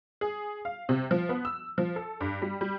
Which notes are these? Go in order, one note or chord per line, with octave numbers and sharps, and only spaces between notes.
G#4
F5
C3
F3
B3
E6
F3
A4
G2
G3
G3